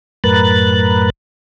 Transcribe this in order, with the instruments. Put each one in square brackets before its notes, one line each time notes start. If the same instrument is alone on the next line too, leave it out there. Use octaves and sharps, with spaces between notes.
[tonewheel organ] F#2 A2 A#4 B4 F#6 A6